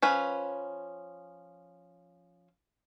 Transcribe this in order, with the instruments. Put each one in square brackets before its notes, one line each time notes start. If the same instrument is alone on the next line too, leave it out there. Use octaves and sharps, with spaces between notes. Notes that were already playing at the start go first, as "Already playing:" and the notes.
[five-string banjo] F3 C#4 B4